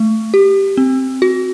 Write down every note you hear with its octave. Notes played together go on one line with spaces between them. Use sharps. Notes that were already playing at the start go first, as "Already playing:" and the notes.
Already playing: A3
G4
C4
F#4